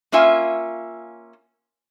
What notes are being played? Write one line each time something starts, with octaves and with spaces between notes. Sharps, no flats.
A#3 C#4 F4 E5 G#5